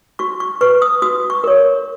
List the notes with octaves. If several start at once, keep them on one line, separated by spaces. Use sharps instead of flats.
F#4 C#6
C#6
B4 C#6
D#6
F#4 D#6
C#6
A#4 C#5